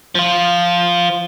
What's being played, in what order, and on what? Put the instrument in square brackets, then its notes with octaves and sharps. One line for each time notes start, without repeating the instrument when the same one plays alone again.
[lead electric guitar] F3 F4